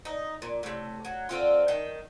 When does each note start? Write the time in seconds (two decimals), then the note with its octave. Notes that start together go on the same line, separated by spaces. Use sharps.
0.05 D#4
0.42 A#2
0.63 A2 C3
1.05 F#3
1.29 D3 C4 F4
1.68 D#3 G5